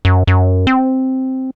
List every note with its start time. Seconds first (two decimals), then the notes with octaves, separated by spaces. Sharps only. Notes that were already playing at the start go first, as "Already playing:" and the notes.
0.05 F#2
0.27 F#2
0.67 C4